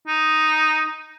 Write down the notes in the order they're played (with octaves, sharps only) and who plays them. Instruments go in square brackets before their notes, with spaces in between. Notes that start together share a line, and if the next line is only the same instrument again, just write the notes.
[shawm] D#4